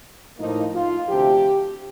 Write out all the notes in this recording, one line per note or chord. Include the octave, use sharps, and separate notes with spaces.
A2 F3 A#3 D#4
F4
D2 C3 F3 G4